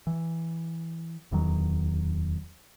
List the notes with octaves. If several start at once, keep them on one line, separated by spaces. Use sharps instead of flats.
E3
D1 E2 D#3 F#3